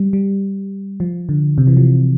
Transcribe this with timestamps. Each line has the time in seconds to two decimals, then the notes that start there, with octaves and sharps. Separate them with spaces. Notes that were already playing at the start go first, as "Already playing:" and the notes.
Already playing: G3
0.13 G3
1.00 F3
1.29 D3
1.58 C3
1.67 E3
1.77 F3